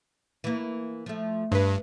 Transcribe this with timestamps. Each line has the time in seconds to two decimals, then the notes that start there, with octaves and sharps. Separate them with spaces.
0.44 E3 A#3
1.06 F3 A3
1.52 G2 B4 C5